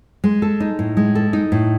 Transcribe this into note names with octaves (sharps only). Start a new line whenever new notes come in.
G#3
A4
D#4
A2
G#3
A4
D#4
A2